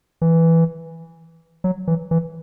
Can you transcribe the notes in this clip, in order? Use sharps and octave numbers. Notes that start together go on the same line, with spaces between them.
E3
F#3
E3
E3